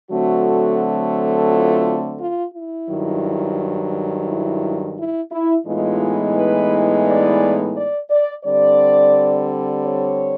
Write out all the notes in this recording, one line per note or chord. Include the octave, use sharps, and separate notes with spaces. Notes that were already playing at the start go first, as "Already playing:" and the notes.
D3 F#3 A3 C4 F#4
F4
F4
E4
G2 D#3 F#3
E4
E4
E4
A2 E3 G#3 B3 D#4 F4
B4
D5
D5
D5
D3 G3 C4 D5
C#5